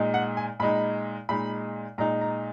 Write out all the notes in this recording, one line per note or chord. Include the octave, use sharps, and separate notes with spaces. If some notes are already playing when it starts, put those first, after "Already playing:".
Already playing: A#2 G#3 D#4
F#5
G#5
A#2 G#3 D#4 B5
A#2 G#3 D#4 B5
A#2 G#3 D#4 A#5
A#5